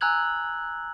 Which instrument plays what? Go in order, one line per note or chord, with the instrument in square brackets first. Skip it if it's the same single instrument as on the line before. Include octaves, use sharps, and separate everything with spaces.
[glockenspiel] G#5 A#5 E6 F#6 G#6 F#7